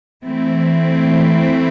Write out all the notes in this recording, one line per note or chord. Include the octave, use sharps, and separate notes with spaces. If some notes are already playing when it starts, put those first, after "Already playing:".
E3 A3 C4 E4